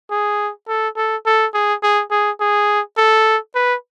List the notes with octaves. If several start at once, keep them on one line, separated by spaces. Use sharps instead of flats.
G#4
A4
A4
A4
G#4
G#4
G#4
G#4
A4
B4